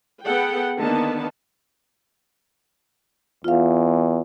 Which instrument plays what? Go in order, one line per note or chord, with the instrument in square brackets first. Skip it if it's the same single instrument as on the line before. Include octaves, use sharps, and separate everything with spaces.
[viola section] B3 G#4 A4 F#5 G5
D3 D#3 A#3 B3 B4 A5
[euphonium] E2 [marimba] F4 F5